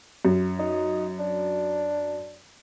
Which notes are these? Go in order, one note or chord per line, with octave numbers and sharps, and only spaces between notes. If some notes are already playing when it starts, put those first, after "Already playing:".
F#2
D#4
D4